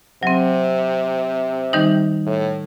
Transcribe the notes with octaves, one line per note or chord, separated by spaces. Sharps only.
C3 F#3 C4
D#3 G3 D#4
A2